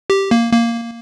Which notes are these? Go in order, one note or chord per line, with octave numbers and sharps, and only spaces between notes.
G4
A#3
A#3